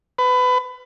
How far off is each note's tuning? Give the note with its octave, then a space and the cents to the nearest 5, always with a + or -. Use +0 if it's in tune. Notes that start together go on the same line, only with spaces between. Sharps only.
B4 +25